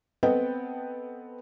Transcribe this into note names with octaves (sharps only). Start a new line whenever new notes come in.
B3 C4 A4 B4 D#5 G5